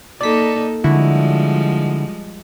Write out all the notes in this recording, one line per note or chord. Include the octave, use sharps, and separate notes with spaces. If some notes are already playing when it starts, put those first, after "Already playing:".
A#3 D#4 A4 D5 B6
D3 F3 G3 G#3 E4 F#4